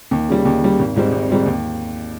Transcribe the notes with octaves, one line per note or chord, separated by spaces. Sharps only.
D#2
C#3 G3
D#2
C#3 G3
G#1
G#2 G3 C4
G#1
G#2 G3 C4
D#2